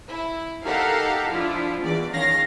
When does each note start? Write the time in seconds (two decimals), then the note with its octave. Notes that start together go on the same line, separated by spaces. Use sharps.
0.10 E4
0.64 D#4 G4 A4 A#4 F5 F#5
1.31 F3 D4 E4 F4
1.82 E2 E3 D5
2.13 D#3 C#4 F5 A#6